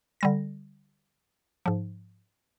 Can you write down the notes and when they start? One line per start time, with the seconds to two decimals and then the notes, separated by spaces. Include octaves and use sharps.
0.21 D3 G3 A#6
1.66 G#2 F3